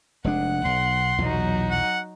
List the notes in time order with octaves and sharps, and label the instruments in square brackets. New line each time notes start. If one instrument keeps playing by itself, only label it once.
[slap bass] F1 G#3 D4 [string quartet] F#5
[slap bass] B1 [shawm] C6
[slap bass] B1 E2 A#2 [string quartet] F#3 D#4 F#4
[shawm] F#5